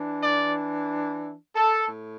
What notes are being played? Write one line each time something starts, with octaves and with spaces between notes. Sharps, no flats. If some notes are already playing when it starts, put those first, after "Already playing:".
Already playing: E3 D4
D5
A4
A2